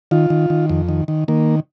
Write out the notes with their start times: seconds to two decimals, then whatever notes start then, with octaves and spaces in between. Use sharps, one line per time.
0.11 D#3 F4
0.30 D#3
0.50 D#3
0.69 F2
0.89 D#3
1.08 D#3
1.28 D#3 A#3